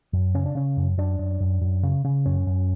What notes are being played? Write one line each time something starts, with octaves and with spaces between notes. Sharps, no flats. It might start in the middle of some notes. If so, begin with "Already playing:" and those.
F#2
C#3 C#4
D4
C#3 C#4
F#2
F#2 D4
F#2
F#2
F#2
C#3
C#3
F#2 C#4
F#2